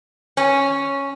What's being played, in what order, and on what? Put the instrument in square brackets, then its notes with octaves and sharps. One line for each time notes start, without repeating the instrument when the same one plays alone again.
[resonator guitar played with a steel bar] C#4